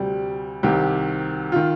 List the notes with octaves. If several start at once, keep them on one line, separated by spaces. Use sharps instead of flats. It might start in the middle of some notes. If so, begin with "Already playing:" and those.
Already playing: D2 C3 G3
C2 C3 D#3 G4
D#3 F4